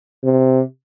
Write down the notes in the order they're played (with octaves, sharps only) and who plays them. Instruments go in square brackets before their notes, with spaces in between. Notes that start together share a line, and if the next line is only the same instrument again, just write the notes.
[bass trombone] C3